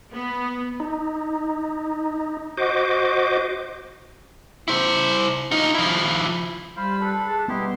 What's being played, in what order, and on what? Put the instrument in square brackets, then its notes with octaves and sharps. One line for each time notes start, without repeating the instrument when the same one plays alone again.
[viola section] B3
[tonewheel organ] D#4
F#4 C5 D#5 D6
[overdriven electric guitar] E4 C5
D#4 F4
F3 E4
[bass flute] G3 [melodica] F4 C5 F5 [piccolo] B5
[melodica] D4 A4 B4
[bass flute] G#4 [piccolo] A5
[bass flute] G3 [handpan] B3 [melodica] D#4 E4 G4 [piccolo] C6